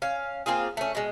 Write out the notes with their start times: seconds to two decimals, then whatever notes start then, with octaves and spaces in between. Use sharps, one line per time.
0.02 C#4 F5
0.46 A#3 C4 F4 G#4
0.77 A3 C#4
0.95 B2 G#3